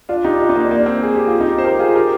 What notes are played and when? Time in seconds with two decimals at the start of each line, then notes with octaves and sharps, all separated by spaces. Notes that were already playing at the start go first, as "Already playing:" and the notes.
0.09 D4 F4
0.24 D#4 G4
0.40 D4 F4
0.49 D#4
0.56 A#3 D4
0.71 A#3
0.86 C4
1.02 G#4
1.15 G4
1.27 F4
1.40 D#4 G4
1.58 C5
1.64 G4 A#4
1.79 F4 G#4
1.95 G4 A#4